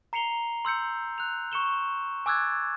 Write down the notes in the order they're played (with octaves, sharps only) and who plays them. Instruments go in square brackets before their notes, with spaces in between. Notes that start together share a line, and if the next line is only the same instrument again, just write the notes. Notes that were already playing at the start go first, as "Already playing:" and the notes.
[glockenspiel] A#5 C7 C#7 F7 G7
C6 E6 G6 C#7
F#6 F7
C#6 C#7 E7 G7
G#5 D6 E6 F#6 G#6 A6